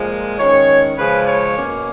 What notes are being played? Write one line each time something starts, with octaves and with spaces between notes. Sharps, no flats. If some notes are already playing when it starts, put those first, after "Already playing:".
Already playing: A#2 F3 G#3
D#3 G#3 C#4 C#5
C#3 F3 G#3 C#4 B4
C#5
B2 A#3 C#4